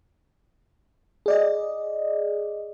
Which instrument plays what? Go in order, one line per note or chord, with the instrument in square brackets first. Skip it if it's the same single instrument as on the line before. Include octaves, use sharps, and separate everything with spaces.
[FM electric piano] G#4 D5 D#5